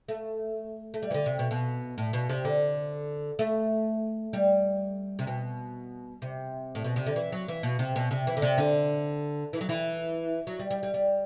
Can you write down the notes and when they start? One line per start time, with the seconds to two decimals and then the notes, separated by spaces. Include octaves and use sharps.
0.08 A3
0.94 A3
1.02 G3
1.11 E3
1.14 D3
1.26 C3
1.39 B2
1.51 B2
1.98 A2
2.13 B2
2.29 C3
2.45 D3
3.39 A3
4.33 G3
5.19 C3
5.27 B2
6.22 C3
6.75 A2
6.84 B2
6.96 C3
7.06 D3
7.16 E3
7.32 F#3
7.48 E3
7.63 B2
7.79 C3
7.96 B2
8.11 C3
8.27 E3
8.37 D3
8.42 C3
8.58 D3
9.53 E3
9.61 F#3
9.69 E3
10.47 F#3
10.59 G3
10.71 G3
10.83 G3
10.94 G3